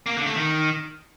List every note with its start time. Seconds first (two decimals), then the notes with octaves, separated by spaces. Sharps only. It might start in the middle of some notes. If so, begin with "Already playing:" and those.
0.06 A#3
0.16 D3
0.26 A3
0.36 D#3